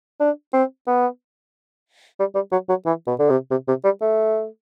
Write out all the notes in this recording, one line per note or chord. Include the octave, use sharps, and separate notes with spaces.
D4
C4
B3
G3
G3
F#3
F#3
E3
B2
D3
C3
C3
C3
G3
A3